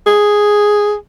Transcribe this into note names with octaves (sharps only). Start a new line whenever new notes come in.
G#4